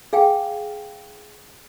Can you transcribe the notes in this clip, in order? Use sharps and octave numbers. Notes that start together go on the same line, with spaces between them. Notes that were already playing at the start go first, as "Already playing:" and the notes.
G#4 F5 G5 G#5